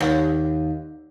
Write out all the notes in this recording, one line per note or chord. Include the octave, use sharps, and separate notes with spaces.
D#2